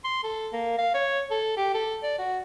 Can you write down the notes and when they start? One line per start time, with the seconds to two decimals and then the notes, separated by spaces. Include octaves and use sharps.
0.04 C6
0.23 A4
0.53 A#3
0.78 F5
0.94 C#5
1.30 A4
1.57 G4
1.74 A4
2.03 D5
2.18 F#4